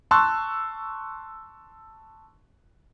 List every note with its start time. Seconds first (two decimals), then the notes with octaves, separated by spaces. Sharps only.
0.11 A5 C6 C#6 E6 F#6